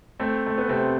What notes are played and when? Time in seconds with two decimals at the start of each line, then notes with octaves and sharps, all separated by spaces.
0.20 A3 C4
0.46 A3
0.58 B3
0.69 C3 A3 C4